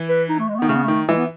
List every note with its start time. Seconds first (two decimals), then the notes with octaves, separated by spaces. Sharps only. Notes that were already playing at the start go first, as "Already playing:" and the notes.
Already playing: E3
0.09 B4
0.29 D#4
0.39 A3
0.48 G#3
0.55 A3
0.59 B3
0.62 D#3
0.69 C#3 A3
0.76 B3
0.84 D#3 A3
1.09 E3 G#3
1.17 B3